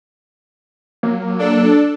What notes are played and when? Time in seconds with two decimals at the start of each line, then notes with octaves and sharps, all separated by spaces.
1.03 F#3 A#3
1.39 D4 A4